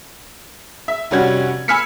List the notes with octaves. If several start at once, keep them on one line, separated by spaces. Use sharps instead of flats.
E5
F1 G3 C#4 F#4 G#6
G#5 B5 E6 F6 B6 C#7